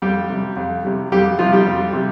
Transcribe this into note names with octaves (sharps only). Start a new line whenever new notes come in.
F2 G3 G4
C3 G3
F2
C3 G3
F2 G3 G4
C3 F3 G3 F4
G3 G4
F2
C3 G3